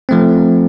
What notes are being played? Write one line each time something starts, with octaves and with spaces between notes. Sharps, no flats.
F3 A3 C4